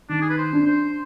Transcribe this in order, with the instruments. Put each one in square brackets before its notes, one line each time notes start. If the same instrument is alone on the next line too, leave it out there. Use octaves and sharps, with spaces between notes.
[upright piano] D#3 [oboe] D4
[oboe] G#4
B4
C5
[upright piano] D4
[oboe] C5